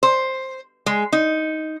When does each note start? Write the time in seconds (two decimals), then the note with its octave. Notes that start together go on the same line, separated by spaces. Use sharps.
0.03 C5
0.86 G#3
1.13 D#4